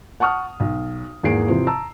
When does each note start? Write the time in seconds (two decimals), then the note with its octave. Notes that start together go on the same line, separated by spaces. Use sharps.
0.20 F#5 A5 C#6 D#6 F6
0.60 B1
1.23 G#1 E2 A#3 G#4 C7 D7
1.48 C3 E3 F3 C4
1.67 A5 A#5 E6